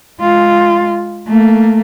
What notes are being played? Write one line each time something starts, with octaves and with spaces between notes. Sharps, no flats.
G#3 F4
A3 A#3